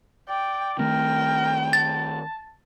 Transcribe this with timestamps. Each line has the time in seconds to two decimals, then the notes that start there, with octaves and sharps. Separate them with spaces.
0.29 D5 G5
0.79 D#3 A3 C4 A#4 G5
1.73 A5 A6